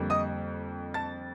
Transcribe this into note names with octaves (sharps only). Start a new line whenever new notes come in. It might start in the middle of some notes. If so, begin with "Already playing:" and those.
Already playing: F2 D3 G3 A#3
D#5 D#6
A5 A6